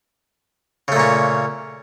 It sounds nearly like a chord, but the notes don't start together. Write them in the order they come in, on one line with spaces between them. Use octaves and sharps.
C#3 A3 A#2 C#4